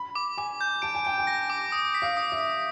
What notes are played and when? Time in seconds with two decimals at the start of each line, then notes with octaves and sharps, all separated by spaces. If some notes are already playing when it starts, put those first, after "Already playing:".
Already playing: B5
0.15 D6
0.38 G#5 D6
0.61 G6
0.82 A5 D7
0.95 G#5
1.05 G5 D7
1.18 G#5
1.27 A#6
1.50 D6
1.72 D#6
1.94 B6
2.02 F5
2.17 D#6
2.32 E5
2.39 D#6